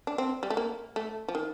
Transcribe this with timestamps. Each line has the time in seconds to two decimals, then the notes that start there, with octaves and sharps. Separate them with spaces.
0.07 D4
0.18 C4
0.43 G3
0.50 A3
0.57 A#3
0.96 A3
1.28 F3
1.35 D#3